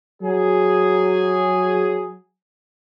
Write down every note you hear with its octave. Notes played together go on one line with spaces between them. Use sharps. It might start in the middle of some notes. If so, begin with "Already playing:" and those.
F#3 G#4